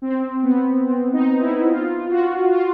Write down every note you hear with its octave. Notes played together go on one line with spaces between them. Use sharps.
C4
B3
C4
D#4
E4
F4
F#4
F4